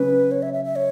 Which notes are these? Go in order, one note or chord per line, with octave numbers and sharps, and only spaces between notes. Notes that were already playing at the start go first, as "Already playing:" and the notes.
Already playing: C#3 F#3 C#4 B4
C#5
E5
E5
E5
C#5